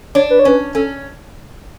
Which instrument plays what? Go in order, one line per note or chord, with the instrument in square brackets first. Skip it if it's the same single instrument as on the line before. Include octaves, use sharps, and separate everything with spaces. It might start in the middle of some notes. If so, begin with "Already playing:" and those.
[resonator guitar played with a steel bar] D4 [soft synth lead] C#5
[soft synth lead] B4
C#5
[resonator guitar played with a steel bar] C#4 [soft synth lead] B4
[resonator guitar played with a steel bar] C#4 [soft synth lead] A4